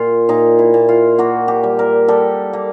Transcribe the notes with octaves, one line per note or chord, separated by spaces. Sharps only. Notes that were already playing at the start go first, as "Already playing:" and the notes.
Already playing: A#2 F4
A#2 D#4
E4
A#2
F4
A#3 F#4
G4
G3
A#4
G3 A4
A#3